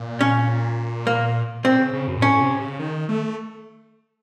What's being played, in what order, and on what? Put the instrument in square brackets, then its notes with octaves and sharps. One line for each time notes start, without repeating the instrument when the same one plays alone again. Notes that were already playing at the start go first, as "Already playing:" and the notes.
Already playing: [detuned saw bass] A#2
[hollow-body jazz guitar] C#4
A#3
[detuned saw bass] A#2 [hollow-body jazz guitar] C4
[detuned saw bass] C#3
C#3
F#2
A#2
[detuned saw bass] A2 [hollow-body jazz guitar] C#4
[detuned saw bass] C3
C#3
D#3
A3